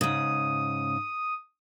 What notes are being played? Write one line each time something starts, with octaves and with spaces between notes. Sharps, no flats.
G#2 C#3 D#6